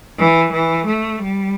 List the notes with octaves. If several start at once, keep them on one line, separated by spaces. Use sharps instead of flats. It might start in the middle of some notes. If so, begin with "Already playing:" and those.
E3
E3
A3
G3